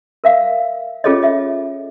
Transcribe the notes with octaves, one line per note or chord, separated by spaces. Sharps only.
A#4 E5 F5
C#4 F4 G#4 A4 C#5 D#5
D#5 E5